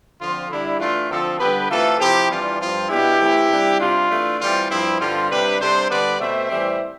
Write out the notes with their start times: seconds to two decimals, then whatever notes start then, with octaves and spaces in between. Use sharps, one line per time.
0.20 D3 F3 C4 F4
0.50 D3 G3 D4 E4
0.80 E3 A3 D4 F4
1.10 D3 F3 C4 F4 A4
1.39 D3 G3 B3 G4 B4
1.70 C3 E3 A3 F4 A4
1.99 C3 F3 C4 E4 G4
2.30 E3 G3 D4 F4
2.59 G2 F3 C4 F4
2.89 B2 B3 D4 E4 G4
3.20 E3 A3 C4
3.49 C3 G3 D4
3.79 C3 G3 D4 F4
4.10 E3 A3 D4
4.39 E3 G3 C4 F4
4.69 G2 F3 C4 E4
5.00 G2 D3 G3 C4 F4
5.30 C3 G3 D4 G4 B4
5.60 C3 G3 D4 A4 C5
5.89 D3 G3 B3 D4 B4 D5
6.19 B2 A3 C4 C5 E5
6.49 A2 E3 G3 C4